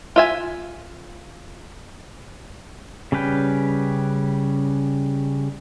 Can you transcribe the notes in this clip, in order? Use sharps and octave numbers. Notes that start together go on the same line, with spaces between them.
F4 E5 G#5
C#3 G3 C#4 B4 G5